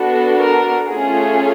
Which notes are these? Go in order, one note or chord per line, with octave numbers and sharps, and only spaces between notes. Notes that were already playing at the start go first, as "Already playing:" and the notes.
Already playing: B3 D4 F#4 A4
A#4
A3 C#4 F4 G#4